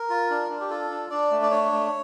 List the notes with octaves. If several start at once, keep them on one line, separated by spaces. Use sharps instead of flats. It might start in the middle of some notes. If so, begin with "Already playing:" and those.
Already playing: A#4
F4
D4
D4
G4
F4 A4
D4
D4 D5
A3
D5
D4 C#5
A3